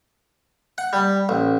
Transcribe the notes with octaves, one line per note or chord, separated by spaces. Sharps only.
F#5
G3
A1